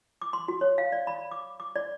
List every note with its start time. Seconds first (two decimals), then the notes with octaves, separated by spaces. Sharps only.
0.22 D6
0.33 C6
0.48 F#4
0.61 C#5
0.78 F5
0.92 D5
1.07 B5
1.31 D6
1.60 D6
1.76 D5